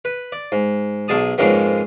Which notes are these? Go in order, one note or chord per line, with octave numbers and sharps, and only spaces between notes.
B4
D5
G#2
B1 B2 G#4 A5 D#6
F2 G#2 C#3 G#3 A#3 B3